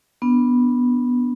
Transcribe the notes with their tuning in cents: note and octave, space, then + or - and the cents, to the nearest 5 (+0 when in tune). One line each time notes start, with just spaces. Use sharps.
B3 -5 D4 -5